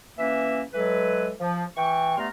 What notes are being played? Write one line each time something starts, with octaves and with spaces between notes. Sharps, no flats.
E3 A#3 C#4 B4 E5
E3 F#3 G#3 A4 B4
F3
E3 G5 C#6
G2 A3 B3 A#5 C6 F6